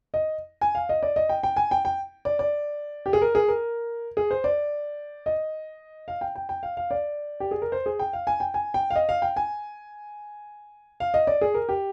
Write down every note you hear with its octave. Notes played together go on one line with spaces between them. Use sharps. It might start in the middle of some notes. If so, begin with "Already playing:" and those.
D#5
G#5
F5
D#5
D5
D#5
G5
G5
G#5
G5
G5
D5
D5
G4
G#4
A#4
G#4
A#4
G#4
C5
D5
D#5
F5
G5
G5
G5
F5
F5
D5
G4
G#4
A#4
C5
G#4
G5
F5
G#5
G5
G#5
G5
F5
D#5
F5
G5
G#5
F5
D#5
D5
G#4
A#4
G4